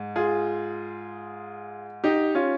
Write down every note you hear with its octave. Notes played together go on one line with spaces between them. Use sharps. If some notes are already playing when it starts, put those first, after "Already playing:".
Already playing: G#2
F4 G#4
D#4 G4
C#4 F4